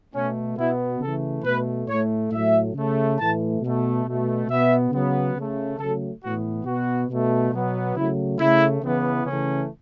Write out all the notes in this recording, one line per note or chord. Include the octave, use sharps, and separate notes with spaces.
B2 A3 C#4
B2 B3 E4
C#3 E3 A3 A4
B2 A3 B4
A2 A3 C#5
A2 F#3 A3 E5
C#3 A3
A2 E3 A3 A5
B2 A3
B2 A3
B2 B3 E5
C#3 F#3 B3
C#3 A3
C#3 F#3 A3 A4
A2 E3 B3 F#4
B2 B3 F#4
B2 A3
B2 F#3 B3
C#3 F#3 A3 E4
C#3 A3 E4
C#3 E3 B3
C#3 E3 A3 C#4